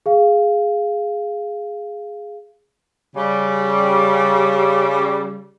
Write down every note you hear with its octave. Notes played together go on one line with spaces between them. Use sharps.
G#4 F5
C#3 G3